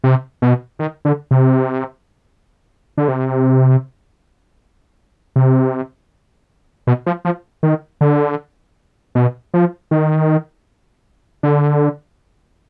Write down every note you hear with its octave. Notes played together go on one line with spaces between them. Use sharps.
C3
B2
D#3
D3
C3
D3
C3
C3
B2
F3
F3
D#3
D3
B2
F3
D#3
D3